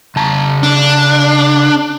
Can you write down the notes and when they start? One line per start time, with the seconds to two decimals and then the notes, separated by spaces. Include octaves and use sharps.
0.16 C#3 A5 A#5
0.63 D4